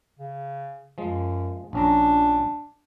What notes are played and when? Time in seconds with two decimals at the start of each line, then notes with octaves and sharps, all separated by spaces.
0.19 C#3
0.98 F#2 F3 G#3
1.73 A#1 C#4 D4 A#5